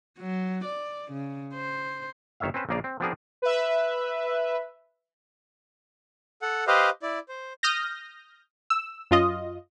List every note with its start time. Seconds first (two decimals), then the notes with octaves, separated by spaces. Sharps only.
0.19 F#3
0.64 D5
1.11 C#3
1.54 C5
2.40 G1 D#3 C#5 E5 F5
2.54 C4 C#4 B4 C5
2.69 A#1 C#3 A#3 G#4 D5 F5
2.84 C4
3.00 F3 B3 C4 D4 G#4 A#4
3.42 B4 E5
6.42 A4 F#5
6.67 G4 B4 C5 D#5 F5
7.02 E4 D5
7.29 C5
7.63 D#6 F6 G6 A#6
8.70 E6
9.11 F#2 F4 D#5